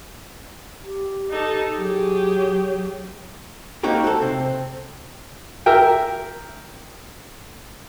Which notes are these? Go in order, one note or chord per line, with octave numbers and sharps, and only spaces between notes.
G4
D#4 A4
F#3 G4 G#4
A#3 C4 D#4 F#4 G4 A#4
F#4 A4
C3 C4
A#4 E5 G5